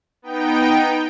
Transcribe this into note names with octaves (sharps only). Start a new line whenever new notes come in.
B3 D#4 G5